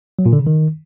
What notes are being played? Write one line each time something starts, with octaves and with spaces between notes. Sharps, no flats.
F#3
A#2
D3
C#3
D#3